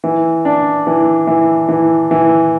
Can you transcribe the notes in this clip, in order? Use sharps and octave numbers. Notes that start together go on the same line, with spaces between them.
E3
D4
E3
E3
E3
E3